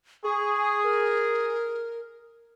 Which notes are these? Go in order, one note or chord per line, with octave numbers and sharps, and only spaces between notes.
G#4 C#6
A#4